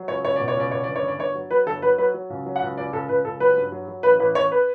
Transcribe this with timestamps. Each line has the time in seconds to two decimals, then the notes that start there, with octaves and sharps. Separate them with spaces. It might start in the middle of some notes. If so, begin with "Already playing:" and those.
Already playing: F#3
0.08 C#2 C#5
0.25 C#2 C#5
0.36 B2 D5
0.48 C#5
0.57 C#2 D5
0.71 C#2 C#5
0.84 G1 D5
0.96 C#5
1.03 G1 D5
1.19 G1 C#5
1.35 F#3
1.51 F#3 B4
1.66 G1 A4
1.82 F#3 B4
1.98 F#3 B4
2.14 F#3
2.30 C#2
2.46 F#3
2.56 F#5
2.62 C#2
2.78 C#2 D5
2.93 C#2 A4
3.09 C#2 B4
3.24 C#2 A4
3.40 F#3 B4
3.57 G2
3.72 F#3
3.88 F#3
4.03 A1 B4
4.20 A1 B4
4.35 A1 C#5
4.52 B4